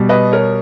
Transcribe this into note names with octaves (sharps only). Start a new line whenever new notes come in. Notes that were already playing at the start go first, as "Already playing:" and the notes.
Already playing: B2 G3
B4 D#5
A#4 C#5